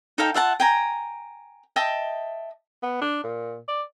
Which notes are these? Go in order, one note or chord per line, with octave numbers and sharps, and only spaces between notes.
D#4 A4 F5 G5
F4 E5 F#5 A5
G5 G#5 A#5
D#5 E5 G5 A5
B3
D4
A#2
D5